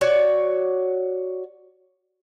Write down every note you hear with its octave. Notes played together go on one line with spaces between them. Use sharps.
F#4 C#5 D5